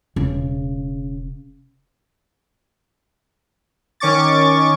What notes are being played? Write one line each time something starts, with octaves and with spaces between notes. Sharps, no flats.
E1 C#3
D#3 C#4 C#6 D6 A6